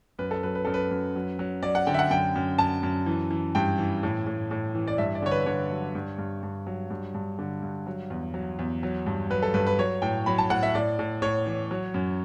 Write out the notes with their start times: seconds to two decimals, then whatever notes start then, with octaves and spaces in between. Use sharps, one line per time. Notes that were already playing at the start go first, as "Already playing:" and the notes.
0.19 F#2 B4
0.31 A4
0.43 F#3 B4
0.55 B4
0.65 F#2 A4
0.74 B4
0.91 F#2
1.16 F#3
1.39 F#3
1.63 F#3 D5
1.75 F#5
1.87 D3 G5
1.94 E5
1.99 F#5
2.10 F#2 G5
2.36 F#2
2.58 F#2 A5
2.83 F#2
3.06 E3
3.31 E3
3.55 G2 G5
3.78 E3
4.03 A2
4.26 A2
4.51 A2
4.75 E3
4.87 D5
4.98 G2 E5
5.15 D5
5.22 D3 C#5
5.31 B4
5.46 D3 C#5
5.71 F#3
5.95 G2
6.18 G2
6.43 G2
6.67 F#3
6.90 G2
7.14 G2
7.39 D3
7.63 G2
7.87 F#3
8.10 E2
8.34 F#3
8.59 E2
8.83 F#3
9.06 G2
9.30 F#3 B4
9.43 A4
9.54 G2 B4
9.66 B4
9.79 F#3 C#5
10.02 A2 G5
10.26 F#3 B5
10.38 A5
10.50 A2 F#5
10.63 E5
10.75 A2 D5
10.99 A2
11.22 A2 C#5
11.46 E3
11.71 F#3
11.94 F#2